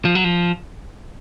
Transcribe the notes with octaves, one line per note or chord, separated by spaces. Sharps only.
F3
F#3
F3